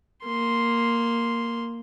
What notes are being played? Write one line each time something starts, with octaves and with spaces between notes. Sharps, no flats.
A#3 C6